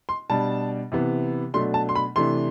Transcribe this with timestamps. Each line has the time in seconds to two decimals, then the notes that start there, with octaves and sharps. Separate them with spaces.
0.09 C6
0.30 B2 G3 D4 A5
0.92 C3 E3 B3
1.54 B2 F#3 A3 D4 C6
1.74 A5
1.89 C6
1.95 B5
2.16 C3 E3 A3 D4 C6